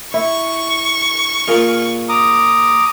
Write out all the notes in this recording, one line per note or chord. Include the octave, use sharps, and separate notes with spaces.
E4 C#6
A#2 F4 G#4 A#4
A#5 D6 D#6